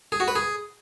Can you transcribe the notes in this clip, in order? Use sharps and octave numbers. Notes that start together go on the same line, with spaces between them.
G#4
F#4
B4
G#4